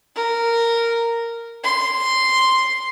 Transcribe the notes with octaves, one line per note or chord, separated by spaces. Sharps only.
A#4
C6